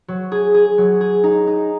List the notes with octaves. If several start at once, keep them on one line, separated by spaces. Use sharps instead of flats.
F#3
G#4
G#4
F#3
G#4
D#4
D#4